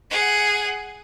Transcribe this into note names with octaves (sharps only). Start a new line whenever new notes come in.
G#4 F#5